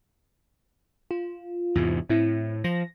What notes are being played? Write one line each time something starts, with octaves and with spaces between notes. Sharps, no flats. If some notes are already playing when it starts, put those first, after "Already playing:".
F4
E2 G#2 C3
A2 C4 E4
F3 A#6